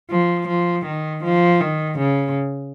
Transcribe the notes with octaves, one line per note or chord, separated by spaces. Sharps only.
F3
F3
D#3
F3
D#3
C#3